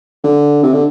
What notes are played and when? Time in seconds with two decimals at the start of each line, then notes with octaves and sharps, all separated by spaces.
0.24 D3
0.63 C3
0.73 D3